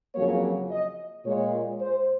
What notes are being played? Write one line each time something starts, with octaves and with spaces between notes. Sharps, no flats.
F2 C#3 F#3 A#3 C#5
D#5
A#2 G#3 C#5
C5